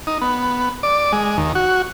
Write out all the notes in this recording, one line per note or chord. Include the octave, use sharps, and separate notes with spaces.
D#4
B3
D5
G#3
D#2
F#4